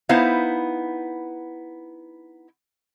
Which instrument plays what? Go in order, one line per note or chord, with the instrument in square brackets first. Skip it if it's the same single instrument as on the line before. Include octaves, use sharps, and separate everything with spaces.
[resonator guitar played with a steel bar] B3 D#4 E4 C5 F5